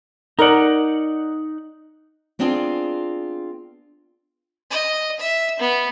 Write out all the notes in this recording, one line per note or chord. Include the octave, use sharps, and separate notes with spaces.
D#4 A#4 D5 F#5
B3 C4 D4 F4 G#4
D#5
E5
B3